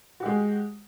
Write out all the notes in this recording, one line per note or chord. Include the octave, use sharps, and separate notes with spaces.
G#3 F#4 G4